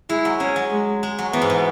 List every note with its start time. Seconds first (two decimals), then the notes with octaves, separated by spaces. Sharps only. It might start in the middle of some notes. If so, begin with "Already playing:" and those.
0.09 G#3 E4
0.25 F#3
0.40 G#3 C#4
0.56 F#3
0.71 G#3
1.03 G#3
1.19 F#3
1.33 E3 B3
1.42 G#2
1.50 B2